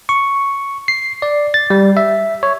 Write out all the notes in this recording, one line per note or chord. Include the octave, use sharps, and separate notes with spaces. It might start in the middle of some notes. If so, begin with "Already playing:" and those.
C#6
C7
D5
A6
G3
E5
C#5